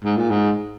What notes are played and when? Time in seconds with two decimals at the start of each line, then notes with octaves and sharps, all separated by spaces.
0.04 G#2
0.17 A#2
0.30 G#2